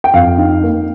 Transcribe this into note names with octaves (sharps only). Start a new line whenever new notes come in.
G5
F2 F5
D#4
A#3